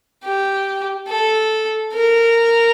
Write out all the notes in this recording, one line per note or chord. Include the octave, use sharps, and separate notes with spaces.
G4
A4
A#4